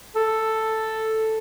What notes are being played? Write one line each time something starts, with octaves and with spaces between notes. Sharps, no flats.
A4